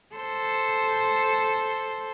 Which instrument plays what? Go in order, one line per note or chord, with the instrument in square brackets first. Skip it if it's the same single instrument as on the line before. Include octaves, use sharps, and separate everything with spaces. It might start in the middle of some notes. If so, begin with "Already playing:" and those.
[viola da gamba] A4 C5